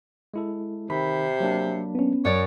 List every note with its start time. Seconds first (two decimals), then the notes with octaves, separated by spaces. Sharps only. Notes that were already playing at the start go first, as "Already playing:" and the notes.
0.34 G#3 E4 A4
0.90 C3 D#3 B5
1.40 F#3 A#3 D4
1.95 B3 C#4
2.25 F#2 C#5 D5